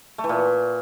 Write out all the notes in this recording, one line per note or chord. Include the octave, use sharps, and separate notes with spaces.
A3
E3
A#2